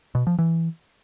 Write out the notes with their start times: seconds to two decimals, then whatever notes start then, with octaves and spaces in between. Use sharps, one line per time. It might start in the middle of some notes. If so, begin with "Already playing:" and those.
0.15 B2
0.27 F3
0.39 E3